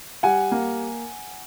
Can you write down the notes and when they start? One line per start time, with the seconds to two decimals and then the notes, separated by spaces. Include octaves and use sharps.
0.23 G3 F#5 G#5
0.52 A#3